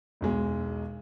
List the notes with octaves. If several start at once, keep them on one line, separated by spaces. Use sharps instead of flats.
E1 B1 G#3